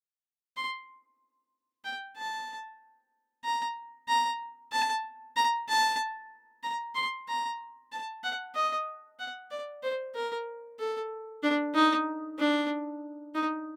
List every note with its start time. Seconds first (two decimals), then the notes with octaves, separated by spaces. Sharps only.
0.57 C6
1.85 G5
2.17 A5
3.45 A#5
4.09 A#5
4.72 A5
5.36 A#5
5.69 A5
6.63 A#5
6.95 C6
7.28 A#5
7.92 A5
8.24 F#5
8.55 D#5
9.20 F#5
9.51 D5
9.83 C5
10.15 A#4
10.79 A4
11.43 D4
11.75 D#4
12.39 D4
13.34 D#4